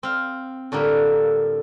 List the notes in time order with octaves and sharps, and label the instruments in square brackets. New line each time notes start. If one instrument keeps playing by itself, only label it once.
[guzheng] C4 F5
A2 D3 G3 A#3